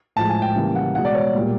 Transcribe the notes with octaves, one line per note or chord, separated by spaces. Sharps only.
A2 F3 G#3 A5
G#5
G5
C#3 E3 G3 A#3
F#5
B2 G#3 F#5
D5
C#5
A#2 G3 A#3